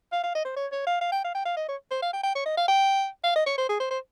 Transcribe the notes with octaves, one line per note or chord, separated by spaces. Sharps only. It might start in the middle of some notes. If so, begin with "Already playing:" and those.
F5
F5
D#5
C5
C#5
C#5
F5
F5
G5
F5
G5
F5
D#5
C#5
C5
F5
G5
G5
C#5
D#5
F5
G5
F5
D#5
C#5
C5
G#4
C5
C5